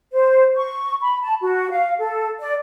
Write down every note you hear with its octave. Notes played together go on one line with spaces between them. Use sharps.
C5
C#6
B5
A5
F#4
F5
A4
D5